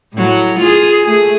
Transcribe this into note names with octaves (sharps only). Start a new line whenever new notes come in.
A2 F#3
F4 G#4
A3 G#4